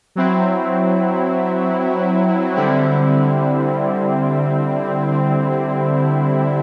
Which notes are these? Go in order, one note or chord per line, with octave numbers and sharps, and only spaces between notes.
F#3 C4 E4
D3 G3 C4 E4